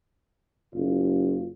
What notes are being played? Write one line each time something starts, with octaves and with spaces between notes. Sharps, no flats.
F#1 F4